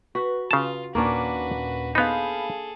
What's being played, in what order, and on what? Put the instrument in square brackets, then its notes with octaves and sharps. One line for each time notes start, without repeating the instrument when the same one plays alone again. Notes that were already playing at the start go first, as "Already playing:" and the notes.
[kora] F#4 [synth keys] B4
[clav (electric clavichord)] C#3 A5 [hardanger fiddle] F4
[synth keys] D#2 A#2 [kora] A#3 C#4 D4 [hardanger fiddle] F#4 B4
[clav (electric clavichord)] B3 D#4 [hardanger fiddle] G#4 A4 [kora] C5 [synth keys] F5 B5